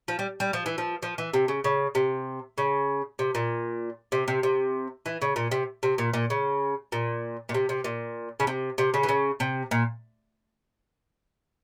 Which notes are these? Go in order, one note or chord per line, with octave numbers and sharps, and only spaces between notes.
F3
G3
G3
F3
E3
F3
F3
E3
C3
C#3
C#3
C3
C#3
C3
A#2
C3
C3
C3
E3
C#3
A#2
C3
C3
A#2
A#2
C#3
A#2
A#2
C3
C3
A#2
C#3
C3
C3
C#3
E3
C#3
C3
A#2